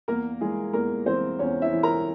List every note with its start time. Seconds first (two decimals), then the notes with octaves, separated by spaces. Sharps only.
0.08 E2 A#3 A#4
0.41 E3 G#3 G#4
0.73 E2 A#3 A#4
1.06 E3 C4 C5
1.39 E2 C#4 C#5
1.62 E4 E5
1.72 E3
1.83 A#4 A#5